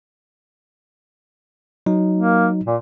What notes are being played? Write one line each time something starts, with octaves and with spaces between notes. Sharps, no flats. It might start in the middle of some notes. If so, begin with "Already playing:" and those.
F#3 D#4
A#3
A#2